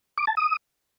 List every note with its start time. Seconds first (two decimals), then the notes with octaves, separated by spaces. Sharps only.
0.18 D6
0.27 A5
0.37 D#6